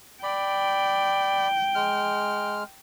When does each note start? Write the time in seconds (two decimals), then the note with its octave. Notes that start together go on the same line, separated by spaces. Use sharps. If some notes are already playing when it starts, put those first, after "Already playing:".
0.23 D5 G5 B5
1.75 G#3 F6